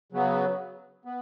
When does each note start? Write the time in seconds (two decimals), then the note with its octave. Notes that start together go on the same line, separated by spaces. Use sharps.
0.12 C#3 F#3 B3
1.05 B3